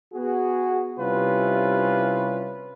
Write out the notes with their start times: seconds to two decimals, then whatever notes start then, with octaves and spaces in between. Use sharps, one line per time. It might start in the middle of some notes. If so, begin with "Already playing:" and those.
0.13 B3 F#4 G#4
0.98 C3 G3 C#4 E4 F4 B4